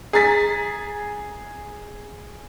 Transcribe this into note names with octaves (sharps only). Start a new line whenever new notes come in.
G#4 A#5 A6 B6